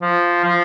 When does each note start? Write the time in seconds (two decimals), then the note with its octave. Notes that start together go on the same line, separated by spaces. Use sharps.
0.02 F3
0.44 F3